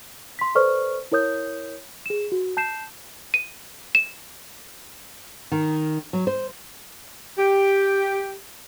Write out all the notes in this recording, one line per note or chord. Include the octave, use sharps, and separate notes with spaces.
C6 B6
A4 B4 C5 D5 C#6 F6
E4 A#4 C#5 D#6 G6
G#4 E7
F#4
A5 G6 C7 E7
D#7
E7
D#3
F#3
C5
G4